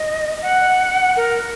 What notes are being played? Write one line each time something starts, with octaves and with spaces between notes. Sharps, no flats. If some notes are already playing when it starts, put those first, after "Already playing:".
Already playing: D#5
F#5
A#4